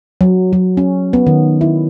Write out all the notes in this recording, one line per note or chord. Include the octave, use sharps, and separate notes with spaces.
F#3
F#3
C#4
B3
D#3
E4